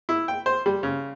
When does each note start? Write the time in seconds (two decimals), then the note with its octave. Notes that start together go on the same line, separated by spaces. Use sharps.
0.09 E4
0.28 G5
0.46 C5
0.66 G3
0.83 C#3